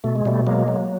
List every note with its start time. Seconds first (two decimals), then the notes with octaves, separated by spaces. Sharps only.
0.04 B2 A3
0.15 G#3
0.25 B2 G3 A3
0.47 F#3 G#3 A#3
0.68 F#3